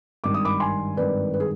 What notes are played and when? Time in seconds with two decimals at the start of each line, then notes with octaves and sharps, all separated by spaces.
0.24 G#1 G2 D#3 D6
0.34 D#6
0.45 B5 D6
0.60 G#5 C6
0.97 G#1 G2 D#3 B4 D5
1.34 B4
1.40 G#4